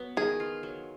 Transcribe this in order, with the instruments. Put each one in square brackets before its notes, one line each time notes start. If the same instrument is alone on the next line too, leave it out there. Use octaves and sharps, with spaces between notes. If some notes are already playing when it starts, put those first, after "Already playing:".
Already playing: [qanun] F#3 B3
[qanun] D#3 [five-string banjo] G#4
[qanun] F4
F#3